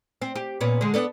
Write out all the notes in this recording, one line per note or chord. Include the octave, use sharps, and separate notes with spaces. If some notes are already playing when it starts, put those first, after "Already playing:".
C4
G4
A#2 B3 C#4
D3 G#3
B3 D4 A4